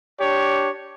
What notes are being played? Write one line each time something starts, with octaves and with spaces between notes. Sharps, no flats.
D4 G4 C#5